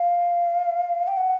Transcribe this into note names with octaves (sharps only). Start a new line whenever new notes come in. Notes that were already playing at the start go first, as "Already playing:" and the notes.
Already playing: F5
G5
F#5